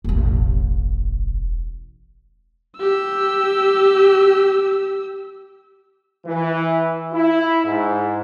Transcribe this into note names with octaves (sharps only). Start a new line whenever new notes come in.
E1 A1
G4 E6
E3
E4
G#2